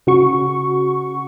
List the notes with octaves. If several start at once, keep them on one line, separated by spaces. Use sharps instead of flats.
C#3 F#4 C#6